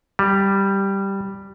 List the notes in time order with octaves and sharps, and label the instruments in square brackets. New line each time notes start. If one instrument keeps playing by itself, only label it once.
[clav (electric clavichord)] G3